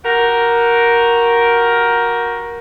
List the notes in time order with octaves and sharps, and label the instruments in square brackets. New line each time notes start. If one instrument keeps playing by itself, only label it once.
[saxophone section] F#4 G4 A#4